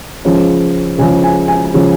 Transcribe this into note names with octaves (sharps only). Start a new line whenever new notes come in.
C#2 C#3 F3 C#5
C#2 C#3 F3 G#5
G#5
G#5
C#3 F3